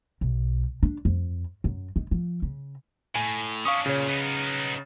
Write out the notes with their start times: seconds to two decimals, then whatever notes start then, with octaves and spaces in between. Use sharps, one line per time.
0.21 B1
0.83 D4
1.05 F2
1.64 F#2
1.96 D#3
2.11 F3
2.42 C#3
3.16 A2 G#5
3.66 C#4 D4 F5 C#6 D#6
3.86 A#2 C#3 C#5
4.08 B3 D#4